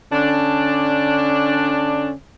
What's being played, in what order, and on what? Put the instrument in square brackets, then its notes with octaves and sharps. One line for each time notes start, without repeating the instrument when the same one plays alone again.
[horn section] D3 C#4 D4